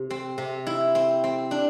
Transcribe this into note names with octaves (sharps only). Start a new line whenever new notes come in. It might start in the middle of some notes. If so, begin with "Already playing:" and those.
Already playing: C3
C4
C3
E4
C4
C4
D4